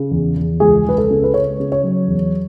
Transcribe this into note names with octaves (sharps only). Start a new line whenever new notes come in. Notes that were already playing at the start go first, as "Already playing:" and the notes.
Already playing: C#3
E2
E2
C#2 G#4
C#2 B4
A4
C#3
B4
C#3 C#5
C#3
C#5
F#3
E2